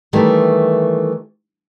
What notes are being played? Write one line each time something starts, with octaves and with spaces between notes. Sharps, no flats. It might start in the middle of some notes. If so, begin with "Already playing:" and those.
D#3 E3 G3 A3 A#3